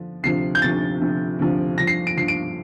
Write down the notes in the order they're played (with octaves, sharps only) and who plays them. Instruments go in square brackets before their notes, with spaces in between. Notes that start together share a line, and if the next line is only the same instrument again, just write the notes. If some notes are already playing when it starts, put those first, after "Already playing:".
Already playing: [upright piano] D3 F3
D2 C3 F3 C7
G6
D2 C3 F3 A6
D2 C3 F3
D2 C3 F3
G2 F3 A#6
C7
D7
G2 F3 C7
D7